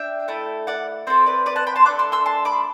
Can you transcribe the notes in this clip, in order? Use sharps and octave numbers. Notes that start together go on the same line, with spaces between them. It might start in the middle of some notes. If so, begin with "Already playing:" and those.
Already playing: D4 E5 G5
A3 E4 A4
D5 F#5
C4 E4 A4 C5 E5
B4 D5
B4 D5
F#5 A5
G5 B5
A5 C6
A3 D4 A4 D6 F#6
C6 E6
C6 E6
A5 C6
B5 D6